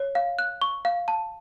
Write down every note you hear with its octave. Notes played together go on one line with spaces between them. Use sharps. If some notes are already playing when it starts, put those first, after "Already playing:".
Already playing: C#5
F5
F#6
C#6
F5
A5